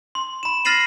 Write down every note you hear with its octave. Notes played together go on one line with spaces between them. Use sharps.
C6
B5 E7
F6 A6 A#6 C7 D#7 F#7